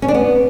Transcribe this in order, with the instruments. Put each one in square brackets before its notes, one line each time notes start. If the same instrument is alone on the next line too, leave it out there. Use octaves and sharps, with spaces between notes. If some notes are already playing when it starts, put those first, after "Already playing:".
[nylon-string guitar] C#4
D4
B3